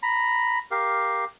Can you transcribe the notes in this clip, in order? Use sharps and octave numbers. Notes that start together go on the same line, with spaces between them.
A#5 B5
G4 A#4 F5